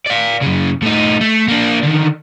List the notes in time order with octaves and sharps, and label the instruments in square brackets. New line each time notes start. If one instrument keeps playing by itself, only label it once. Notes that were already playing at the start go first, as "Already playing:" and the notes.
[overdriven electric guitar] D5 F5
F#2 C#3
A2 D#4
A3
A#3 D4
D3 D#3